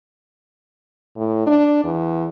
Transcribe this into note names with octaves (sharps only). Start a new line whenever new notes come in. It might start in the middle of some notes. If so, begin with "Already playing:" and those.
A2
D4
E2